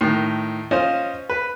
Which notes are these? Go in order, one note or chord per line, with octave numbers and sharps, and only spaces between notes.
A2 D#3
C#4 F4 C5 D#5
B4